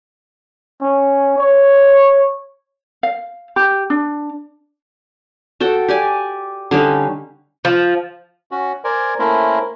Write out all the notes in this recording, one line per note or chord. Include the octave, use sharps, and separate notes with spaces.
C#4
C#5
F5
G4
D4
F#4 A4 G5
G4 D5 G#5
D3 G3 C#4 D#4
F3
C#4 F#4
A#4 C5 D5 G#5
A3 A#3 C#4 E4 A#4 C5